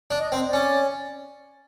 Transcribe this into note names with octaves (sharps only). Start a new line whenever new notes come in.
D4
D#5
C4
D5
C#4